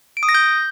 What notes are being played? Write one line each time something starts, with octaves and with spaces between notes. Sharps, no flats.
D7
D#6
A#6
G6